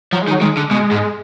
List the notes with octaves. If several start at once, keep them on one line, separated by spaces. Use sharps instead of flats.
F3 F#3
G#3
D#3
F#3
D#3 G#3
D3
B2 G#3
G#2